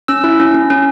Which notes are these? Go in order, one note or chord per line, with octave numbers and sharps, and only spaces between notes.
C#4 E6
E4
C#4
C#4
C#4